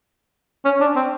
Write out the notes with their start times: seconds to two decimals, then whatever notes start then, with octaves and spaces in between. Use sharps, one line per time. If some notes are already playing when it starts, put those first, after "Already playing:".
0.65 C#4
0.80 D4
0.96 C4